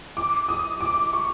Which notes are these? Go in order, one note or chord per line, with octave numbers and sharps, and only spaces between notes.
D6
D#6
D6
C#6